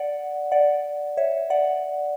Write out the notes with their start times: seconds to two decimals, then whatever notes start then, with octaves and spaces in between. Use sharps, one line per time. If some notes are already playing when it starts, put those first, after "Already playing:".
Already playing: D5 F#5
0.51 D5 F#5
1.17 C#5 E5
1.50 D5 F#5